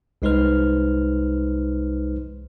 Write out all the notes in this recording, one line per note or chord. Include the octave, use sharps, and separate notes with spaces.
C2 G#3 D#4 B4 C5 F6